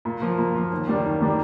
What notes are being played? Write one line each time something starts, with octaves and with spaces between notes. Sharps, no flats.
A#2
F3 A#3
A#2
F3 A#3
D#2
D#3 G3 A#3 D4
D#2
D#3 G3 A#3 D4